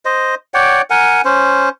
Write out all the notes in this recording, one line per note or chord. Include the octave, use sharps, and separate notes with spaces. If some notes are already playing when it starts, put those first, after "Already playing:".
C5 D#5
C#5 D5 F#5 G5
A#4 F#5 G#5
C#4 C5